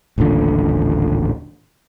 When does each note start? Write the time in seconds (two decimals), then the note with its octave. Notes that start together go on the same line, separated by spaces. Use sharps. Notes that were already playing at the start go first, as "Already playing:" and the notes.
0.18 D#1 A1 A#2 D3